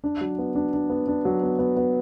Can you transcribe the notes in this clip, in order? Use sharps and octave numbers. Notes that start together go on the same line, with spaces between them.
D4
F#3
B3
D4
D4
B3
D4
F#3
B3
B3
B3